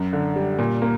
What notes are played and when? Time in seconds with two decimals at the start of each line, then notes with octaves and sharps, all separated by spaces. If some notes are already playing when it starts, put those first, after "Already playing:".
Already playing: F#2
0.13 D3
0.36 G3
0.59 A#2
0.82 A#3